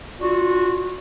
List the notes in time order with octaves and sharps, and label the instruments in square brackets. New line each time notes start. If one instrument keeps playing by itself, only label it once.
[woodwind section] D4 F4 F#4